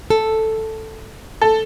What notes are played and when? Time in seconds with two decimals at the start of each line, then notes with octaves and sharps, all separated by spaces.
0.10 A4
1.41 A4